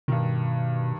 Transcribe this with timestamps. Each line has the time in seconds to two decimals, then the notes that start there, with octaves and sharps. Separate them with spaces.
0.08 G2 B2 D#3